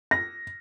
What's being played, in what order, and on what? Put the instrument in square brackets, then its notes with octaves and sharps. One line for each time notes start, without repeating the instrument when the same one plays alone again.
[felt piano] A#6